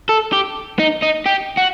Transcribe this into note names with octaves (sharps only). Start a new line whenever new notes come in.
A4
G4
D#4
D#4
G4
F#4